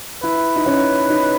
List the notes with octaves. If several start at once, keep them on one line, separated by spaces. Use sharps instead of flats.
E4 B4
D#4
C#4
D#4